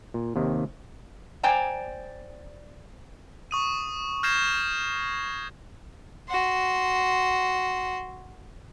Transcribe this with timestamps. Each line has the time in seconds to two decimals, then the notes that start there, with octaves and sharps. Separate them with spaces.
0.14 A#2
0.36 D#2 C3 D#3
1.43 C5 D5 G5 G#5 A#5
3.51 C#6 D#6 D#7
4.23 F6 G6 G#6 A#6 C7 E7
6.29 F#4 C6